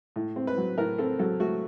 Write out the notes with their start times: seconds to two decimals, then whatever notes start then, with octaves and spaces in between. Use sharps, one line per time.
0.16 A2
0.36 C4
0.47 B4
0.58 F#3
0.78 A2 A#4
0.98 C4 A4
1.19 F#3 A4
1.40 A3 F#4